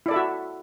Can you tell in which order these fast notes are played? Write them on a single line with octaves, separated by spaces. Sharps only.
E4 D5 A4 E5 F#4